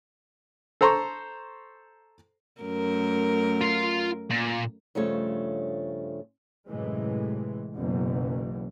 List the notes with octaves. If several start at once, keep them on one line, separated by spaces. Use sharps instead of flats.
A4 C5 A#5 C6 C#6
F#2 A3 A#4
F4 C6
A#2
G2 C#3 F3 A3 C#5
F#2 A2 C3 E3 G#3
F#1 B1 F#2 B2 E3